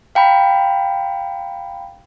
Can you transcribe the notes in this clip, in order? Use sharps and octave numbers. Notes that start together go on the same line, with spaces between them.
F5 G5 A#5 B5